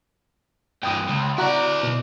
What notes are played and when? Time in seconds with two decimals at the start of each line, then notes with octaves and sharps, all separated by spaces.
0.83 G2 E3 G5 D#6
1.08 C#2
1.38 E4 F#4 D5 A#5 F#6
1.83 B2